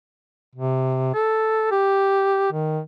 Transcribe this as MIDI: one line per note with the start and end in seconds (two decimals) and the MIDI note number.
0.55 1.12 48
1.14 1.70 69
1.71 2.52 67
2.52 2.80 51